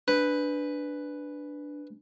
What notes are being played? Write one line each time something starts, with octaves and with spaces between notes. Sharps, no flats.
D4 B4